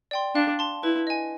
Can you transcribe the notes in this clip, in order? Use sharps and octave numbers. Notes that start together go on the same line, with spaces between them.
D5 G5 C6
D4 F5
A5 C6
E4 B4
D#5 G#5